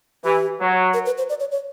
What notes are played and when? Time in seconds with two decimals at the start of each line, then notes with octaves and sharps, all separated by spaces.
0.25 E3 G4
0.60 F#3
0.94 A#4
1.06 B4
1.18 C5
1.29 D5
1.40 C#5
1.52 C#5